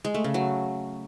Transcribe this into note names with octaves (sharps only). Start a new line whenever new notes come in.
G#3
A3
C#3
F#3